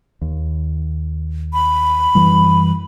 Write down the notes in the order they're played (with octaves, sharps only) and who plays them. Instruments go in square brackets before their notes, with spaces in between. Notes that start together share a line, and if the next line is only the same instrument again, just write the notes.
[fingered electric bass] D#2
[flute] B5
[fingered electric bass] F#2 E3 G3